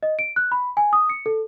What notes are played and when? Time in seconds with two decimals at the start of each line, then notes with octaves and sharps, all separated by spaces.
0.03 D#5
0.19 D7
0.36 F#6
0.52 B5
0.77 G#5
0.93 D#6
1.10 C#7
1.26 A4